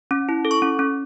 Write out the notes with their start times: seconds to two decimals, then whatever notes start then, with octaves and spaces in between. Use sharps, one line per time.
0.11 C#4
0.29 E4
0.45 A4
0.51 C#6
0.62 C#4
0.79 C#4